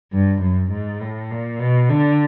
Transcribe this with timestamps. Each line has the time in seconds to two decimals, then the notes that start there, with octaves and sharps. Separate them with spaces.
0.13 G2
0.42 F#2
0.71 G#2
1.01 A2
1.30 A#2
1.60 B2
1.89 D3